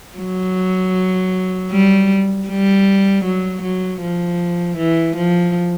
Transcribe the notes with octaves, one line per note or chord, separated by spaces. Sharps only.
F#3
G3
G3
F#3
F#3
F3
E3
F3